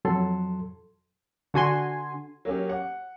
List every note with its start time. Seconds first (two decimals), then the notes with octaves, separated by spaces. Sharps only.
0.05 F2 F#3 A4 C6
1.54 D3 F#4 G#5 C6
2.45 F#3 A#3 C#4 G4
2.69 F#5